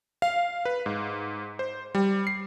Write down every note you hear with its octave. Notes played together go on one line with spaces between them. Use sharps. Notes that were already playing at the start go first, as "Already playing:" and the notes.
F5
B4
G#2
C5
G3
C7